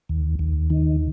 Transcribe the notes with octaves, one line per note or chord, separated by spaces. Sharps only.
D#2
D#2
D#3